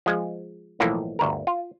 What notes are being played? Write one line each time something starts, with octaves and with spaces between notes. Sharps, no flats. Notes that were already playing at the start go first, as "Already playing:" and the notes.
F3 G#3
B1 A2 E3 F3 A#3
G1 D2 A#4
F4